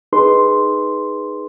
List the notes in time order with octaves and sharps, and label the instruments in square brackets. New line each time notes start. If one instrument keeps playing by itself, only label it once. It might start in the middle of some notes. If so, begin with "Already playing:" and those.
[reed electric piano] D#4 G#4 B4 C6